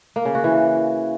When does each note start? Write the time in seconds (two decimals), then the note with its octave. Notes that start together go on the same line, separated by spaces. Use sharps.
0.16 A#3
0.25 C#3
0.35 F#4
0.44 E3